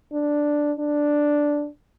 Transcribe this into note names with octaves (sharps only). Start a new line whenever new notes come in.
D4
D4